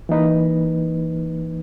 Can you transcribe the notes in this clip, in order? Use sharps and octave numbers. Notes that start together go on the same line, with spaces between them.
E3 A#3 D#4 B4